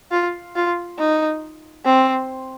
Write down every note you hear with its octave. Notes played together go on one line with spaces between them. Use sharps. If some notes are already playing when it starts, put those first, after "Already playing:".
F4
F4
D#4
C4